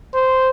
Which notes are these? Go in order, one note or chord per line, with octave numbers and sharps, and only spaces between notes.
C5